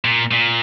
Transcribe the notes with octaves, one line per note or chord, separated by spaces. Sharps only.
A#2
A#2